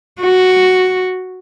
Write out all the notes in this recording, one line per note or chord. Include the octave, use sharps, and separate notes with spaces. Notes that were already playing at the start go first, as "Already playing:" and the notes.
F#4